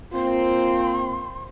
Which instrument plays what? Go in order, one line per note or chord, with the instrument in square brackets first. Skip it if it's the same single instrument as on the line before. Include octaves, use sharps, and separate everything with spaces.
[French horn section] A#3 C4 [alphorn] F4 [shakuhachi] C6